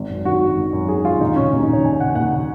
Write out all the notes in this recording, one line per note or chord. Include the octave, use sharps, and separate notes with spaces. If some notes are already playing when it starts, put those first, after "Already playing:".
Already playing: G#1
F#2
D#3 F#4
G#1
G#1
F#2
D#3 G#4
G#1 F4
D#2 D#4
C#3 C#4
D#2 D#4
D#4
C#3 C#5
D#2 G#5
C#3 F#5
D#2 F#5
C#3